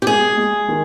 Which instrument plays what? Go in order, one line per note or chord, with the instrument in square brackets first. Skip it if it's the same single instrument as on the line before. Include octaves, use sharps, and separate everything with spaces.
[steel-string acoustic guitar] G4
[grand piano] G#3 [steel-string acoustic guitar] G#4
[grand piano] G#3
D#3